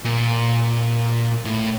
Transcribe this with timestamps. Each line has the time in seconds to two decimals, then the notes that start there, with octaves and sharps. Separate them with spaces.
0.05 A#2
1.45 A2